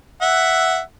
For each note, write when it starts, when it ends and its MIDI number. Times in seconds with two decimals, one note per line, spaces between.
0.22 0.79 76
0.22 0.79 78